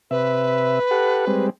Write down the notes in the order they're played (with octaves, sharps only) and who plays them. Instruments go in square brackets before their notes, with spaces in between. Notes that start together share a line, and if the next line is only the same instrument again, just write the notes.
[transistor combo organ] C3 E5 [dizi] B4
[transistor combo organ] G4 A4 F#5
G3 G#3 C4